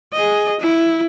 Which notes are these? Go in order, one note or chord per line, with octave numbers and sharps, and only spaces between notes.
G#4 D#5
E4